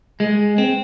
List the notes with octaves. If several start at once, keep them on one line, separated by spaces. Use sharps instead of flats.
G#3
C4